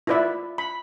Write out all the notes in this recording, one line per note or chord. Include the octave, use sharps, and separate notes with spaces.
E4 F4 B4 D5 E5
B5